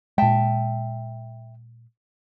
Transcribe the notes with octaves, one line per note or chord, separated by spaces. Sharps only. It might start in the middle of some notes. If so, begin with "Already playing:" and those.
A#2 G#3 E5 G5 A5